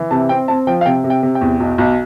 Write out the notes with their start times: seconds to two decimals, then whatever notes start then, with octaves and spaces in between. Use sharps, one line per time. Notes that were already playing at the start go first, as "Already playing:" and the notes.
Already playing: E3
0.11 C3 A5
0.29 C4 G5
0.48 C4 A5
0.67 F3 G5
0.81 F5
0.86 C3 G5
1.04 C3
1.10 G5
1.23 C3
1.35 G5
1.41 E2
1.60 B1
1.78 B1